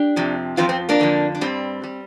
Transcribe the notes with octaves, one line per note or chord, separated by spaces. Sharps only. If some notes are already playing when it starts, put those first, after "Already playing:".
Already playing: D4 G4
F2 C3 F3
F2 D3 F3 C4 F4
C4
A#3 D4
F2 D3 F3
D4
G2 G3 C4
G3